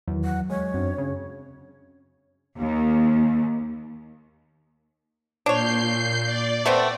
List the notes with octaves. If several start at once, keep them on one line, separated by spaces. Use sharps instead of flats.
E2 D#3 F#3
F#3 F#5
G#3 C#5
F#2 C4 D4
C#3
D#2
A#2 D4 C#5 G6 C7
D5
A3 B3 C4